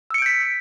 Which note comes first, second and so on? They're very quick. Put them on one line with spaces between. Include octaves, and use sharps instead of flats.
E6 C#7 D7 G6 B6